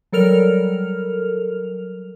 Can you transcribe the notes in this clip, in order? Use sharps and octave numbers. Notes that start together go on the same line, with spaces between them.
F#3 G3 A4 A#4 F6 F7